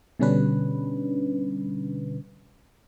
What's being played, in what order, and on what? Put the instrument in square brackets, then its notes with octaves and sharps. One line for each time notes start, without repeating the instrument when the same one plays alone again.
[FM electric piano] B2 D3 G3 C#4 D4 B4